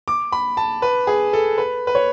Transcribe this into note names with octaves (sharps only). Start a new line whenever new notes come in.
D6
B5
A5
B4
G#4
A4
B4
B4
C#5